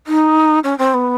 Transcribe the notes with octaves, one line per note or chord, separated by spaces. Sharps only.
D#4
C#4
C4
B3